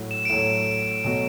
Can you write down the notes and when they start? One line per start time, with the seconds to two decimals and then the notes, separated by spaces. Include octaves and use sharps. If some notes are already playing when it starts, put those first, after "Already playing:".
Already playing: A2 F#3 A3
0.11 E7
0.25 D7
0.30 A2 F#3 A3 E7
1.04 B2 F#3 A3 F#4